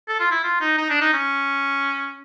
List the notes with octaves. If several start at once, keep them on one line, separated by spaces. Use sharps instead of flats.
A4
F4
E4
F4
D#4
D#4
D4
D#4
C#4